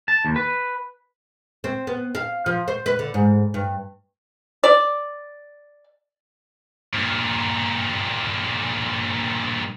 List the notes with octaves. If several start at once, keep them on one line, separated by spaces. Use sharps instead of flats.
A5
D#2
B4
C4
B3
F5
F3
C5
B4
D3
G#2
G2
D5
G2 A#2